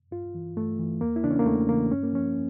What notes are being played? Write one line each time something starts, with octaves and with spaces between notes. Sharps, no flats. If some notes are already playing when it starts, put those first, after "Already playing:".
G2 F4
E3
G2 A3
E3
E2 A#3
E4
C#3 E3 D4
C#4
A#3
E2 A3
C#3 E3 A#3
G2 C#4
A#3
F3 C#4